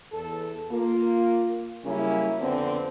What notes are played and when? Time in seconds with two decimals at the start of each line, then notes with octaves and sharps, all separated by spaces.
0.12 E2 A4
0.71 A#3 F4
1.84 C#3 F#3 G3 A#3 C#4 E4
2.39 F2 D3 B3 C4